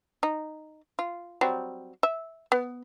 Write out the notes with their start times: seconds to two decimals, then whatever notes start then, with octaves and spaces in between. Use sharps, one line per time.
0.23 D#4
0.99 F4
1.41 F#3 G3 C4
2.03 E5
2.52 B3